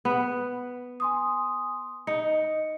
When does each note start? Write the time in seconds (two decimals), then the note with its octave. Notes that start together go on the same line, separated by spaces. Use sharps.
0.05 B3
1.00 G#5 C6 D#6
2.07 D#4 C#7